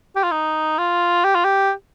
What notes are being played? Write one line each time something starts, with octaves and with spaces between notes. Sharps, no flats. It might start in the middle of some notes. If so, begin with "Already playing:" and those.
G4
F4
D#4
F4
G4
F4
G4